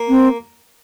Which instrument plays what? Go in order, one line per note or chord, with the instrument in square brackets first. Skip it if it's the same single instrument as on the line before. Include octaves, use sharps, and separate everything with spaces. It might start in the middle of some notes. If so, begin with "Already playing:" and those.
Already playing: [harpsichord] A#3
[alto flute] C4